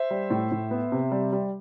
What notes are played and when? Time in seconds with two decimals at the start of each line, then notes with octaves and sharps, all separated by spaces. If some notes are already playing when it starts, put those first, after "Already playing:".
Already playing: C5 E5
0.11 G3
0.30 A2
0.51 A2
0.71 B3
0.92 C3
1.12 G3
1.33 G3